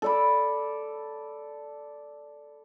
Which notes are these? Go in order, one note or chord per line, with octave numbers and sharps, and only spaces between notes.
A4 D5 B5